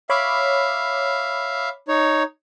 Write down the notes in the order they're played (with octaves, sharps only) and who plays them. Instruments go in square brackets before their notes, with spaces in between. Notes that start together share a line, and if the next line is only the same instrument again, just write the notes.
[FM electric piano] C#5 B5 D6 [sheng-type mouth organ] E5 F5
[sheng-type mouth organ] D#4 C#5